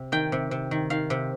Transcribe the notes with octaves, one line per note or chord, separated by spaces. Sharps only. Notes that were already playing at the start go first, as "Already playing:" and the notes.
Already playing: C3
D#3 G5
C3
C3
D#3
D#3 F5
C3